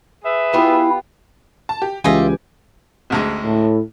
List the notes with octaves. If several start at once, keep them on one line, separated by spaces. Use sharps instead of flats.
G#4 B4 E5
B3 E4 F4 G4
A5
G4
C#2 E3 F4 G4 D#5 E5 G#5
A1 D2 G#3
A2